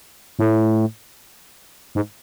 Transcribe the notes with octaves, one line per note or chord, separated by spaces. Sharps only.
A2
G#2